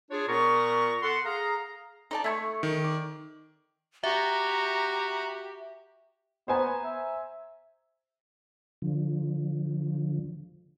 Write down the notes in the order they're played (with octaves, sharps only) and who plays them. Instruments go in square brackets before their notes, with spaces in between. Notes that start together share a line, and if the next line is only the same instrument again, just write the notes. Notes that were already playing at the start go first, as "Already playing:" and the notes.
[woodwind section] D4 F4 G#4 C#5
A#2 B3 A#4 A#5 C#6
A4 F#5 C6
G#4 F5 A#5
[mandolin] D#4 D5 A5
A3 G#5 C#6
[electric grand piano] D#3
[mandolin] D5
[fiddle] F#4 [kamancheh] G4 [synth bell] E5 [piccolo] A#5
[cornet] B3 [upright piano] C5 G#5 A#5
[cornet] E5
[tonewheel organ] D3 F3